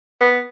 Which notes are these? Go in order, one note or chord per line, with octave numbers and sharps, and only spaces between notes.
B3